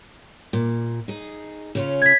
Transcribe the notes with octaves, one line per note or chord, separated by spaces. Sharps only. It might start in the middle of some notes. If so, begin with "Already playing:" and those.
A#2
D#4 G#4
C#3 C#4 F4
G#6 B6